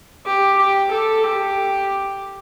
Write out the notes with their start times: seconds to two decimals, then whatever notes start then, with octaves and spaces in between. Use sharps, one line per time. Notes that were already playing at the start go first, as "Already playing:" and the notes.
0.26 G4
0.57 G4
0.91 A4
1.24 G4